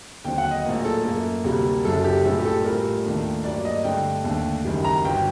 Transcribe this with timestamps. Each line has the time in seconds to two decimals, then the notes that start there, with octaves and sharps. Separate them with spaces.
0.24 D#2 D3 F#3 C4 G5
0.38 F#5
0.51 D#5
0.65 A#1 A2 F#3 A#3
0.85 A4
1.04 F#2 F#3 A#3 A4
1.44 D2 C3 G3 A#3
1.85 F#1 F#2 F#3 A4
2.04 G4
2.25 A#1 A2 G3 C4 A4
2.39 G4
2.45 A4
2.64 A#1 A2 G3 A#4
3.05 D#2 D#3 A3 D4
3.44 G2 F#3 A#3 D4 D5
3.65 D#5
3.84 G2 D3 A3 C4 G5
4.24 D#2 D3 A3 D4
4.65 F#1 F#2 D#3 G3
4.84 A#5
5.05 G1 F#3 G5